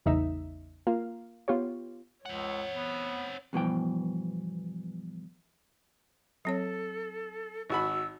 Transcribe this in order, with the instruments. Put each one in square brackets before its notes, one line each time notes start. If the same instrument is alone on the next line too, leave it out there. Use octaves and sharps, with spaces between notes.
[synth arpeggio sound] A1 E2 C#3 D#4 E5
A#3 F4 F5
B3 F4 G4 C#5
[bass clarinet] C#2 [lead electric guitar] C4 F#5 [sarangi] C#5
[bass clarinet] B3
[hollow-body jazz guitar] E2 G2 B2 E3 F3 G5
[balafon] F#3 C4 C#5 [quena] A4
[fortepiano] G#1 F#4 B5 [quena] E6